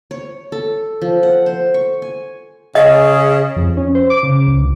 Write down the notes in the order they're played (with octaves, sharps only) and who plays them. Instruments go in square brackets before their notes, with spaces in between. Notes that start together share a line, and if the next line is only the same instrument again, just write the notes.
[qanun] C#5
A4
F3
F#5
C5
C#6
G#5
[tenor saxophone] C#3 [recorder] G#4 [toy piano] D#5
[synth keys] F2
C#4
C5
D6
C#3
C#2
D2